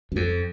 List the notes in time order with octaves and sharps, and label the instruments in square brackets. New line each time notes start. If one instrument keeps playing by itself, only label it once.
[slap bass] F#2
F2